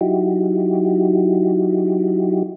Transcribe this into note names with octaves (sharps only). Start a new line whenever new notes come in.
F#3 D#4 E4 F#4 G4